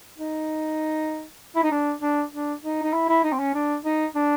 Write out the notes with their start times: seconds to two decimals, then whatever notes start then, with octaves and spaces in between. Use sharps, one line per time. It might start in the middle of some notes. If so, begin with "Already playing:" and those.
0.19 D#4
1.55 E4
1.63 D#4
1.71 D4
2.02 D4
2.32 D4
2.63 D#4
2.83 D#4
2.93 E4
3.09 E4
3.24 D#4
3.33 C4
3.39 C#4
3.54 D4
3.85 D#4
4.15 D4